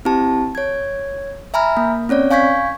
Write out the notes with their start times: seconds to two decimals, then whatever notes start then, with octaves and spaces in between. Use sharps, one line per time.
0.05 C4 E4 G4 A5
0.55 C#5 G#6
1.54 E5 G#5 A#5 B5 F6
1.77 A#3
2.09 C4 C#4 C#5 D5
2.31 F5 G#5 C#6 G6 G#6 B6